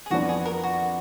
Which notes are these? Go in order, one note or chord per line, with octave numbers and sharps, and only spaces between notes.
G#4
F2 F3 B3 D4 F#4
G#4
A#4
F#4